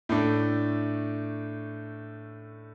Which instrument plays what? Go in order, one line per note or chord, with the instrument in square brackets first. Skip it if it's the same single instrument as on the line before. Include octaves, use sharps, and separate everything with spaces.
[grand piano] A2 A3 D4